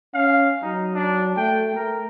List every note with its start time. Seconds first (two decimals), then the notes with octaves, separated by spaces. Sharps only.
0.14 C#4 F5
0.62 F#3 D#4
0.94 D4
1.37 A3 G5
1.76 A3 A#4